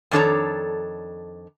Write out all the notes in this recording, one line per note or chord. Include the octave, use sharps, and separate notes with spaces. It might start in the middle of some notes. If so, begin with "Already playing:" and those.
F2 D#3 D4 A4 C#5 A#5